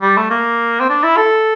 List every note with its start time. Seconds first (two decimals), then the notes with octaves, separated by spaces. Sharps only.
0.02 G3
0.17 A3
0.31 A#3
0.80 C4
0.89 D4
1.04 E4
1.17 A4